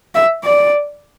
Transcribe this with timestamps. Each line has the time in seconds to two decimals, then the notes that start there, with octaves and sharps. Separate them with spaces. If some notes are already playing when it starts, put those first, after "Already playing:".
0.15 E5
0.44 D5